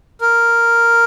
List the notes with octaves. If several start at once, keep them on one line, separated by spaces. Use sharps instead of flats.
A#4